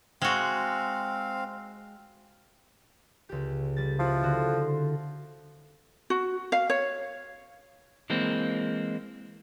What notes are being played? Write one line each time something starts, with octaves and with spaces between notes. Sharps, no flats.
G#3 C4 F#4 F5
C#2 G4
G3 A6
F3 E4 F#4
D3 F#4
F#4
F5
C#5
E3 G#3 A#3 C4